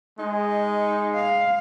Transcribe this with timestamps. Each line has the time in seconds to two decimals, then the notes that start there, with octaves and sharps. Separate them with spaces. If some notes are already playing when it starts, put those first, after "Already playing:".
0.19 G#3 D#4
1.14 F5